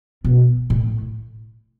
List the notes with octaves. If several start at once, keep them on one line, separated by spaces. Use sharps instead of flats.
B2
A2